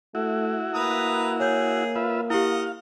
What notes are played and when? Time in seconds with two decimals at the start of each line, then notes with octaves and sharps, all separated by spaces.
0.15 A3 E4 F#4
0.74 A#3 B4 A#5 D#6
1.40 G#4 C#5 G6
1.95 F4 B4 E5
2.30 E4 G4 D#5 F5 F#5